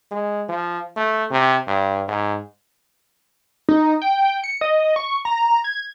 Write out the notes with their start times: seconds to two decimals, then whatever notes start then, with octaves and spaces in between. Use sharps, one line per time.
0.11 G#3
0.49 F3
0.97 A3
1.31 C3
1.68 G2
2.08 G#2
3.69 D#4
4.02 G5
4.44 C#7
4.61 D#5
4.96 C#6
5.25 A#5
5.64 G#6